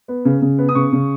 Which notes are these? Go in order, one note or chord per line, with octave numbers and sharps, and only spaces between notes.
B3
C#3
C#3
B3
D#6
C#3 C#6
C#3